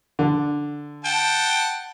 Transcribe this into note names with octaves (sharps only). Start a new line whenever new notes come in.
D3
F#5 G5 A5